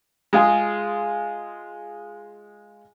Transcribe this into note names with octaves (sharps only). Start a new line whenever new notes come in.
G#3 F4 G#4